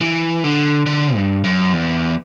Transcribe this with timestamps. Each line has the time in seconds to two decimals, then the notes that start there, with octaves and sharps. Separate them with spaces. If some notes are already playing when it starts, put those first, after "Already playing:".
0.01 E3
0.44 D3
0.86 D3
1.16 G2
1.44 F#2
1.73 E2